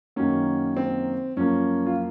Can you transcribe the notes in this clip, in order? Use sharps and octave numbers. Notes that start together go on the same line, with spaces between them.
F#2 D#3 F#3 A#3 C#4
C4
F#2 F3 A#3 C#4
F4